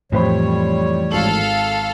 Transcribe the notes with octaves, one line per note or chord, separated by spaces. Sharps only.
F2 A2 E3 G3 A3 C5 C#5 B5
G#1 A4 F5 F#7